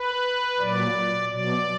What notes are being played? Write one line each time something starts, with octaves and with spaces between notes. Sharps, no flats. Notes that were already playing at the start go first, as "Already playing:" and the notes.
Already playing: B4
A#2 F#3 D5
B2 F#3 D5